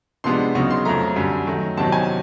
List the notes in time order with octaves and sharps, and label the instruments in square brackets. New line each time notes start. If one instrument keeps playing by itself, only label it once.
[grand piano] C3 F3 G#3 B3 D4 C6
E2 C#3 F#3 B3 D#4 C#6
C6
F2 C#3 F#3 A3 A#5
F#2 D3 G3
D#3 F#3 A3
E2 C3 D#3 F#3 A5
G#5